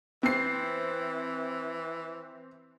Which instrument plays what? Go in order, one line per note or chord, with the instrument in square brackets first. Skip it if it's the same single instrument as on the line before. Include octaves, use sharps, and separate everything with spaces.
[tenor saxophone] E3 [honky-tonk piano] C4 C7